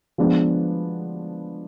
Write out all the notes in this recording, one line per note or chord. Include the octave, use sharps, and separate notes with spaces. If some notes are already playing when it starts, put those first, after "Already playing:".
F3 G#3 B3 D4